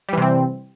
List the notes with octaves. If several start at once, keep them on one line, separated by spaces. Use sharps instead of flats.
C3 E3 G3 C4